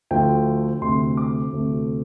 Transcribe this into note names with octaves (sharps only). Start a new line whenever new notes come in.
D2 D3 F3 A3 G5
D2 C3 A3 C6
D6
D2 C3 A3